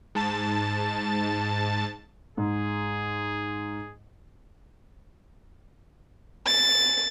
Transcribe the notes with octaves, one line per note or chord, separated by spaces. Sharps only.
G#2 A5 A6
G#2 G#4
A6